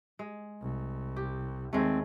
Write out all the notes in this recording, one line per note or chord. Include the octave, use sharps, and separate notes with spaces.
G#3
C2
G4
D#2 G#3 A3 C4